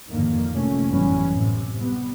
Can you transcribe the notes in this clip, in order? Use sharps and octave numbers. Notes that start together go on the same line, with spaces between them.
F2 G#2 D3 D#3 A#3
F1 A3 A#3 C#4
G#1 F#2 E3 G3 B3 C#4
A2 C3
G3 B3